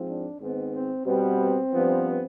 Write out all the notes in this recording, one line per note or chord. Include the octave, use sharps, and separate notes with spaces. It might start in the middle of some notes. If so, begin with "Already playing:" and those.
Already playing: G#2 F3 C4
D4
G#2 D#3 B3 C4
C4
B2 G3 B3 C4
G2 F3 B3